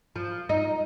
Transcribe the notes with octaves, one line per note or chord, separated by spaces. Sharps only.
F3
D#4